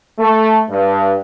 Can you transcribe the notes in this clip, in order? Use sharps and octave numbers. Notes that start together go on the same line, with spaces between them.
A3
G2